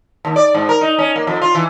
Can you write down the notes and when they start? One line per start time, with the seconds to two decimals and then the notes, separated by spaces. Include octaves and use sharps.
0.25 D#2
0.36 D5
0.55 G#2
0.69 A#4
0.81 D#4
0.99 C#4
1.16 A#3
1.27 F2
1.42 F4
1.55 E3